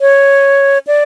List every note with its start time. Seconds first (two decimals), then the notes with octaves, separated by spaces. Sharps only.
0.01 C#5
0.87 D5